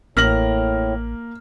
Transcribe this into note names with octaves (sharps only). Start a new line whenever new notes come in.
A1 A2 A#3 F6 A#6 F#7